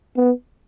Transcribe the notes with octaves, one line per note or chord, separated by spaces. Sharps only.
B3